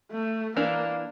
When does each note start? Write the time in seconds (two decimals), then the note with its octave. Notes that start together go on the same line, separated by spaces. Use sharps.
0.11 A3
0.56 E3 A#3 D4 A#4